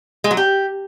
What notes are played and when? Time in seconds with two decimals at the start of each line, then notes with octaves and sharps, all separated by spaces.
0.24 G#3
0.31 F#3
0.37 G4